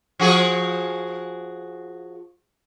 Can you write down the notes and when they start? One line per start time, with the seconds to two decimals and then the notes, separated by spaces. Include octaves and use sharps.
0.19 F3 F#4 G#4